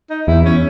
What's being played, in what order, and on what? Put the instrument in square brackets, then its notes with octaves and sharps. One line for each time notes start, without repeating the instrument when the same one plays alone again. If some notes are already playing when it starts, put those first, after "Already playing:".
[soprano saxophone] D#4
[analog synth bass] E2 [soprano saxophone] E4
[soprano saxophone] C#4